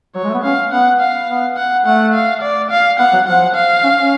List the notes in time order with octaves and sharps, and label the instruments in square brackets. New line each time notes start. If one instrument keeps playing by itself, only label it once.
[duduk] F#3 [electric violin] C#5
[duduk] G#3
A3
B3
[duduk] C#4 [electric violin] F5
[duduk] B3 [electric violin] F#5
[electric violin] F5
[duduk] B3
[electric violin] F#5
[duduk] A3 [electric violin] F#5
[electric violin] F5
D5
F5
[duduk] B3 [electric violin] F#5
[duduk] F#3
[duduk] F3 [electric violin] F#5
[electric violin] F5
[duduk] C#4
C#4